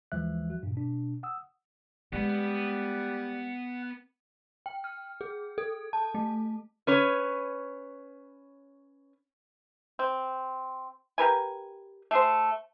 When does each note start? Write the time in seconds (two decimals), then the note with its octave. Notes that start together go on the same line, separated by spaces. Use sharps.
0.12 D#2 E3 F3 G#3 E5 F#6
0.50 F#4
0.63 G2 A#2
0.75 B2 D4
1.23 F#5 D#6 E6
2.13 G3 G#3 B3 B4 F#5
4.66 G5
4.84 F6
5.21 G#4
5.58 A4
5.93 A5
6.15 A3
6.87 C#4 B4 C#5
9.99 C4
11.18 G4 A#4 B4 G#5
12.11 A3 G#4 C5